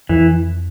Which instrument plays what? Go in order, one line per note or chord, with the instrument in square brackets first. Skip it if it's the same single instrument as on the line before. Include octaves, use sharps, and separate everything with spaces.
[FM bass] F2 [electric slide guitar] E3